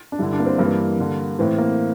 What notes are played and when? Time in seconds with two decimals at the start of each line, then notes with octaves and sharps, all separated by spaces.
0.12 D4
0.19 G2 D3 E4
0.33 D4
0.40 A#3
0.46 C4
0.58 G2 E3 A#3
0.99 G2 D3
1.39 A2 E3 C4
1.58 A#3